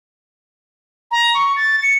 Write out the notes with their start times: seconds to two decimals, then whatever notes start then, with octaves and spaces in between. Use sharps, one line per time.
1.11 A#5
1.34 C#6
1.56 A6
1.83 C#7